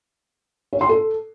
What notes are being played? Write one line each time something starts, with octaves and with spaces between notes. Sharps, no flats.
C#5
C6
A4